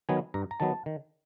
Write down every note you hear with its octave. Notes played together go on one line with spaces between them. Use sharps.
D#3 F#3 B3 G#5
G2 A#5
A#5
D#3 F#3 B3 A5
D#3